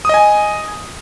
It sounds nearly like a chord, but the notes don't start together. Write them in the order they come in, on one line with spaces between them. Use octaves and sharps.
D#6 D#5 G#5